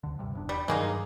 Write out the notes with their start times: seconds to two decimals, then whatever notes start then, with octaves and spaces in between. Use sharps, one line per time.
0.03 D2 D3
0.19 G2 C3 G3
0.33 D#1 E2 D4
0.49 G3
0.68 G2 D#3 F#3 G#3 A#3 D#4